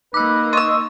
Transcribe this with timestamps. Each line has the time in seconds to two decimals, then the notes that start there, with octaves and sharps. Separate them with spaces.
0.14 A#3 D#4 B4 D6 E6
0.53 D#5 C6 C#6 E6